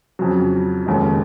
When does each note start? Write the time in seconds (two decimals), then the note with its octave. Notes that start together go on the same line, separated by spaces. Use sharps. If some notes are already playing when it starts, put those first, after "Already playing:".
0.19 F2 C#3 F#3
0.86 F1 D#2 C#3 G#3